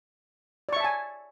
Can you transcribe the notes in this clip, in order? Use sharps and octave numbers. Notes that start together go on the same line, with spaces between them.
D5 E5 G#5 A5 C#6